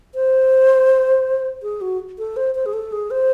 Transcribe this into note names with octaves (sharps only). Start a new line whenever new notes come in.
C5
G#4
F#4
A4
C5
C5
G#4
A4
G#4
C5